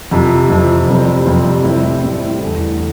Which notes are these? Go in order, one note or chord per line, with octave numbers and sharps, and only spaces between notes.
F2 C3 F3
F2 C3 F3
F2 C3 G3 C4
F2 C3 G3 C4
A2 G3 C4 E4
A2 G3 C4 E4
E2 D3 A3